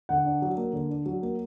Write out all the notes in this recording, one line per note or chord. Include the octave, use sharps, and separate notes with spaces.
D3 F#5
D4
F#3
A#3
D3
D4
F#3
A#3